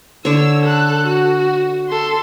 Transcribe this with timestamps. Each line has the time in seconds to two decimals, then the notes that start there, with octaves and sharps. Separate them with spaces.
0.25 D3 C#5 E6
0.62 A4 F#6
1.07 F#4
1.89 A4 C6